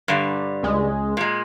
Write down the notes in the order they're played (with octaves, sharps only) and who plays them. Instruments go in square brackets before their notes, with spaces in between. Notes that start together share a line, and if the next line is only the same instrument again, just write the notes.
[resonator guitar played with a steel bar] G2 D3 G3
[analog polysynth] C#2 G#3
[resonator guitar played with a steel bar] A#2 G#3